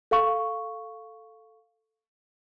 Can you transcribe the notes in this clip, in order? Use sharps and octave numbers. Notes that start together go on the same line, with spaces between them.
A4 F5 C#6